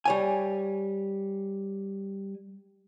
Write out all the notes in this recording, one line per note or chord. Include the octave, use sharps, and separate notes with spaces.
G3 C#5 G#5